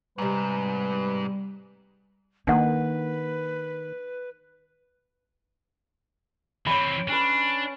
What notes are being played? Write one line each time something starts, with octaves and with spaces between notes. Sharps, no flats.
G#2 C3 G3 B4 A#5
D#3 A#3 D4 B4 F#5
E3 C4 C#5 B5
C#4 D4 B4